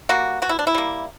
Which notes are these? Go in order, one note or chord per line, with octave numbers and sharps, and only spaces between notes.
G3 A#3 F#4
B2 F#4
E4
D4
E4
G3 A#3